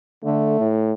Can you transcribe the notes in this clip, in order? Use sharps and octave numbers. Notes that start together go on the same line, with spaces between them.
D3 A3
A2